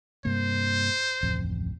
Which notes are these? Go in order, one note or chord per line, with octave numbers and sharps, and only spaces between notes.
G2 C3 A#3 C5
D1 A1 F2